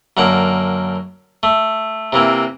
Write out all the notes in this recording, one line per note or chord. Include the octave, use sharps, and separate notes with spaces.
F#2 D3 A#3 F#5
A3
C3 E3 A#3